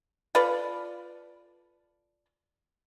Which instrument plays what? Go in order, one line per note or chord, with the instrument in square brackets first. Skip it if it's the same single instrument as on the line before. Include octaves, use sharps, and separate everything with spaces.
[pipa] F4 A4 B4 D5